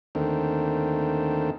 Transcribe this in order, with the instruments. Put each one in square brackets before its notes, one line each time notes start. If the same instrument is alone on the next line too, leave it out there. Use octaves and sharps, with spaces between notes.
[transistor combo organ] D#2 D3 D#3 A3 C4